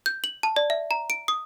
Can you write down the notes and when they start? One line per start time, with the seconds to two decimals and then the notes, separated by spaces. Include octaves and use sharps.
0.06 G6
0.24 F#7
0.43 A5
0.56 D5
0.70 E5
0.91 A#5
1.10 D7
1.28 D#6